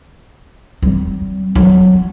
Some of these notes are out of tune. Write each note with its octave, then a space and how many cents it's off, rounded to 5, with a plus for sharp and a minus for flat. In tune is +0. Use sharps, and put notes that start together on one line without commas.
G3 -45 C4 -5
F#3 +0 B3 +45